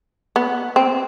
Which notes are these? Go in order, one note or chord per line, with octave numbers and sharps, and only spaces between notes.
B3
C4